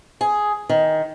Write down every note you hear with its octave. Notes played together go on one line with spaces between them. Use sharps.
G#4
D#3